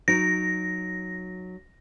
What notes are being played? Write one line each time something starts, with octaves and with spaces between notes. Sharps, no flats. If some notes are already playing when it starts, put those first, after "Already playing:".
F#3 D#4 A#6